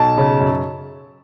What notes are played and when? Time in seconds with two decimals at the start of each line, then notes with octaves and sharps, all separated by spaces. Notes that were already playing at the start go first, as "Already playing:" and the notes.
Already playing: B1 A5
0.18 C#3
0.40 F#2